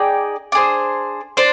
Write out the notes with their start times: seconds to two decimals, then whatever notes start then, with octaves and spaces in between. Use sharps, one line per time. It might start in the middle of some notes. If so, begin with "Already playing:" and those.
Already playing: D#4 G#4 D5 G5
0.52 D4 G#4 C5
1.37 D4 C5